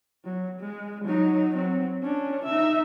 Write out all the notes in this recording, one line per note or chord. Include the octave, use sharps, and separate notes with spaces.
F#3
G#3
F#3 D#4
F#3 C4
C#4 D4
D#4 E5